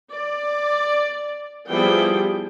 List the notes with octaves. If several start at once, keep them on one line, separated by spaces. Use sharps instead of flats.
D5
F3 G3 B3 E4 G#4 G5